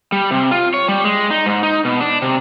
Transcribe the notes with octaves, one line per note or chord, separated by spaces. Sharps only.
G3
C3
F4
C#5
G3
G#3
D#4
G#2
D#4
B2
D4
C3